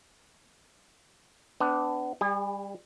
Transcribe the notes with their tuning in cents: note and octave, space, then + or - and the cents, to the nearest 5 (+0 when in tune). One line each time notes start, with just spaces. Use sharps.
B3 +30 D4 -5
G3 +20 G#4 -40